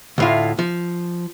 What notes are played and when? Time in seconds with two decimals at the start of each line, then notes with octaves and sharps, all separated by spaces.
0.18 D2 A2 F4
0.59 F3